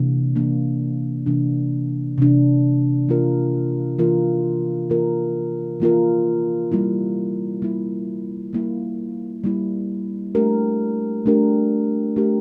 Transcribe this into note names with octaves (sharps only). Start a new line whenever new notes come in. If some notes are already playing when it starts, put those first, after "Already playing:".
Already playing: C3 E3 A#3 D4
C3 E3 A#3 D4
C3 E3 A#3 D4
C3 E3 A#3 D4
E3 A#3 F4 A#4
E3 A#3 F4 A#4
E3 A#3 F4 A#4
E3 A#3 F4 A#4
G3 A#3 E4
G3 A#3 E4
G3 A#3 E4
G3 A#3 E4
A3 D4 G4 A#4
A3 D4 G4 A#4
A3 D4 G4 A#4